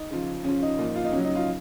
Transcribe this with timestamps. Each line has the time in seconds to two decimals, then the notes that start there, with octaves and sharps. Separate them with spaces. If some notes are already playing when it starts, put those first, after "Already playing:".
Already playing: D#4
0.11 C#3 F3
0.44 C#3 F3 C#4
0.62 D#4
0.79 A#2 F3
0.96 F4
1.04 D#4
1.12 C#3 F#3 C#4
1.24 D#4
1.35 F4